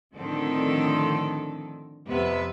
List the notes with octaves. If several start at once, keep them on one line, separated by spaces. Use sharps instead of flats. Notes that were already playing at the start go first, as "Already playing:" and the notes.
A2 D3 D#3 F3 C4 A4
F2 C3 B3 B4 E5